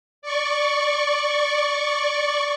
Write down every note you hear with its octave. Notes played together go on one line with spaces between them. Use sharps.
D5 C#6